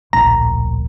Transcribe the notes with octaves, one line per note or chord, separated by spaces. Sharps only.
D1 A#1 A#5